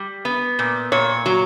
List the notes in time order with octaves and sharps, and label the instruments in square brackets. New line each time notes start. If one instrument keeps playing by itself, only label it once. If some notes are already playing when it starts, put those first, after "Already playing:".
Already playing: [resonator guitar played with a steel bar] G3
B3
A#2
A#2 C#5
F#3